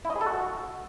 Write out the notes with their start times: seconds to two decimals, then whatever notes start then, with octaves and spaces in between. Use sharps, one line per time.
0.05 E4
0.10 D#5
0.16 G#4
0.21 A4
0.26 F#4